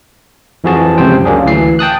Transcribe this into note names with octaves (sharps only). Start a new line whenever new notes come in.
F2 E3 F3 F#4 G#4 A5
C#2 F#2 C3 C4 C5 G5
F#3 A#3 C#4 D4 G#4
D2 E3 C7
G5 A5 D#6 F#6